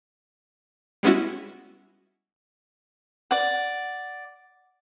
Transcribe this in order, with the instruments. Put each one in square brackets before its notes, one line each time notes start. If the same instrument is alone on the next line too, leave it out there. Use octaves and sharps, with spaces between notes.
[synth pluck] G3 G#3 B3 C#4 E4 F#4
[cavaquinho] D5 F#5